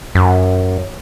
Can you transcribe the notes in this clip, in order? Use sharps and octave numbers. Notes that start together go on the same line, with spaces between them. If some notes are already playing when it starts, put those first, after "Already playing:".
F#2